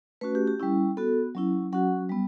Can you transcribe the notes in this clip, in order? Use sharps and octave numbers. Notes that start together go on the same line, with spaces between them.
A3 C#4 F#4 B4
G4
G4
G3 C#4 E4
B3 F#4 A4
F#3 C#4 E4
F#3 C#4 F#4 F#5
G3 B3